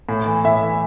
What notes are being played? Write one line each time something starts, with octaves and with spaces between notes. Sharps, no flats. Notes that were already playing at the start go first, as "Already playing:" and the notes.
A2
E3
A2 E5
E3